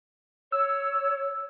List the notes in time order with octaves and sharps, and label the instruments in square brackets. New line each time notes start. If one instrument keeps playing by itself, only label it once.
[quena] C#5 [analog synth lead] E6